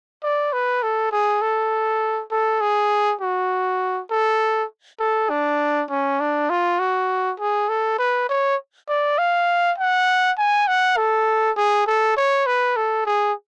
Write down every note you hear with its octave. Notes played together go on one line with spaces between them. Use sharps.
D5
B4
A4
G#4
A4
A4
G#4
F#4
A4
A4
D4
C#4
D4
F4
F#4
G#4
A4
B4
C#5
D5
F5
F#5
G#5
F#5
A4
G#4
A4
C#5
B4
A4
G#4